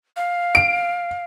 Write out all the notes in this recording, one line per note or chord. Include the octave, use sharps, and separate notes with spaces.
F5
D7